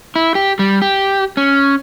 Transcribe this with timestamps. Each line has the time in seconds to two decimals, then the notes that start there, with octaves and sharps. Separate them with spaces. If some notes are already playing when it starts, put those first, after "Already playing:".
0.16 E4
0.35 G4
0.59 G3
0.82 G4
1.37 C#4